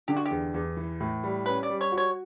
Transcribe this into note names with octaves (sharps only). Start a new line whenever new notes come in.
D3 G4
F#4
G4
E2
E2
E3
A2
G3
C#4 B4
D5
G3
C#5
F#4
C#5